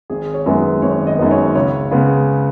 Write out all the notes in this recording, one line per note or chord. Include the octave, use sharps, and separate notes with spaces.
G#1 G#4
C#5
F#2 D#3 G#3 B3
B4
G#1 C#5
D#5
F#2 D#3 G#3 B3
C#5
C#2 C#5
C#3 G#3 B3